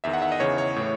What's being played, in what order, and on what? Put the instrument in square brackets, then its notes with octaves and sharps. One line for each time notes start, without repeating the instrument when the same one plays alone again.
[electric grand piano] E2 D#3 E5
F#5
E5
D#5
E2 C#3 E3 C#5
C#5
A2 E3